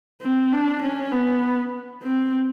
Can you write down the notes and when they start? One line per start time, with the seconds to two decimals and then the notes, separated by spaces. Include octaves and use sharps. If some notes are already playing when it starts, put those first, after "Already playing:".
0.22 C4
0.52 D4
0.82 C#4
1.12 B3
2.03 C4